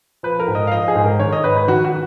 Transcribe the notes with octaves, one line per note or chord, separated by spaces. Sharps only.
F3 B4
A#4
G#2
D#5
F5
F3 D#5
G#4
G#2
A#4
D#3 C#5
D#5
G#2 B4
B4
D#3 F#4
F#4